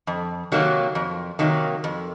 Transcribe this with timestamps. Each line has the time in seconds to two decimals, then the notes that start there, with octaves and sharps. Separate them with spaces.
0.07 F2
0.52 C3 D#3 F#3 A#3
0.95 F2
1.39 C3 D#3 F#3 A#3
1.84 F2